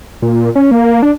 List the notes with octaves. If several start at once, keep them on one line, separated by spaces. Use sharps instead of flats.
A#2
C#4
A#3
D4